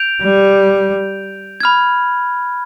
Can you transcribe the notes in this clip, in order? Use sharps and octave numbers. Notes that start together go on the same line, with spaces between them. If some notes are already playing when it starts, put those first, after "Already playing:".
Already playing: G6 D7 F7
G3
B5 F6 G#6